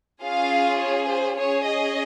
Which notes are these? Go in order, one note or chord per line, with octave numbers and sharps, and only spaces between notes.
C#4 F4 G#4 F5
C#5
C5
C#4 G#4 C#5
D#5